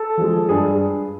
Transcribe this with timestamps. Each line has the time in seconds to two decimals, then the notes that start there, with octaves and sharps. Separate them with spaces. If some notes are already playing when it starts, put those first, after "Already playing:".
Already playing: A4
0.17 F3 G#3
0.49 G2 G#4